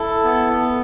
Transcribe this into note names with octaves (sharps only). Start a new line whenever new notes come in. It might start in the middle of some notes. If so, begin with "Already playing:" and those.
Already playing: E4 A4
B3